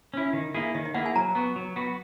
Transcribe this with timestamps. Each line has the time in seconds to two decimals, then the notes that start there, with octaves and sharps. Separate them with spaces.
0.14 C#4 E4
0.33 D#3
0.54 A#3 E4 G#4
0.75 D#3 D#5
0.85 D#5
0.94 A#3 E4 G#4 F#5
1.06 G#5
1.16 F#3 A#5
1.35 B3 F#4
1.56 F#3
1.76 B3 F#4